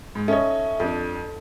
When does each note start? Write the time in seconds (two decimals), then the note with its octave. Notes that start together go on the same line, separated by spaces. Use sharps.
0.15 G#2
0.28 C#4 D#4 A4 C#5 E5
0.80 F2 D4 A4